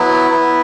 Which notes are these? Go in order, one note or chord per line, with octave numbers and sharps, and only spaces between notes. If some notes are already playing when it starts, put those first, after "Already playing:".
Already playing: F#3 B3 E4
B3 E4